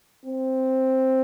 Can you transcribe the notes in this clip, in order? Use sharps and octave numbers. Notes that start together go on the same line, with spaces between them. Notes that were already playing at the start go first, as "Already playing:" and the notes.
C4